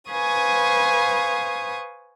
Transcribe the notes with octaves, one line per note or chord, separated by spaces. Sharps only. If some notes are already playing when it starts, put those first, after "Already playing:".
B4 C5 F5 G#5 C#6 D#6